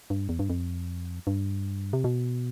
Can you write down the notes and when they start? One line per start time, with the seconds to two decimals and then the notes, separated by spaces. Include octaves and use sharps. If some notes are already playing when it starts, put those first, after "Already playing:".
0.10 G2
0.29 E2
0.39 G2
0.50 F2
1.27 G2
1.93 C3
2.04 B2